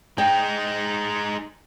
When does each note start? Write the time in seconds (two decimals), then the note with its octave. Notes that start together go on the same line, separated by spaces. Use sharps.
0.18 G#3 D#4 G5